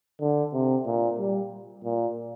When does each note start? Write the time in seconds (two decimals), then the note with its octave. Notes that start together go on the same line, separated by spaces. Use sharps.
0.21 D3
0.53 C3
0.86 A#2
1.18 G3
1.84 A#2